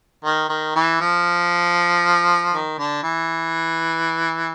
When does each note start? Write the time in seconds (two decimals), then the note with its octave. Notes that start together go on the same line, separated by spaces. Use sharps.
0.25 D#3
0.49 D#3
0.76 E3
1.01 F3
2.52 D#3
2.78 D3
3.03 E3